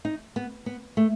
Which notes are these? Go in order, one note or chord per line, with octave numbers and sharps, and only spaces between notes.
D#4
B3
B3
A3